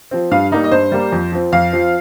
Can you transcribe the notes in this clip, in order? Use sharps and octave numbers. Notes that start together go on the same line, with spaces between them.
F3 C4
G2 F5
G3 A#3 D#4
D#5
G2 C5
G3 A#3
F2
F3 C4
F2 F5
F3 C4